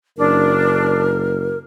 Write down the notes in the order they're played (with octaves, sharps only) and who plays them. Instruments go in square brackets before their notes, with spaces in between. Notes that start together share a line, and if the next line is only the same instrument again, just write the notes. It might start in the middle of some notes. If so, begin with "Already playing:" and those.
[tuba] F#1 [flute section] D4 [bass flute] A#4